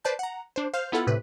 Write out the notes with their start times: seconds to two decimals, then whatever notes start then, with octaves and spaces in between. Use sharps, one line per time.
0.04 B4 C5 D5 A5 G6
0.19 F#5 A#5
0.56 D4 C5
0.74 C5 F5 F6 G6
0.92 B3 E4 F4 A4 F#5
1.07 A2 C3 B4